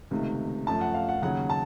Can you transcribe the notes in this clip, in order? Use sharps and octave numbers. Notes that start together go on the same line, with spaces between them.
C#2 C3 D#3 A3
F#2 F3 A3 A5
F#5
F5
F#5
D#2 C#3 F#3 F#5
A5